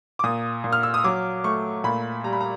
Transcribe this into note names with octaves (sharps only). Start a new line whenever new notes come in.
D6
A#2 D#6
A#2
F6
E6
D#6
F#3 D6
A3 C#6
A#2 B5
G3 A#5
B5
A#5